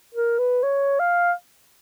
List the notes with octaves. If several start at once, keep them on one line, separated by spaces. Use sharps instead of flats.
A#4
B4
C#5
F5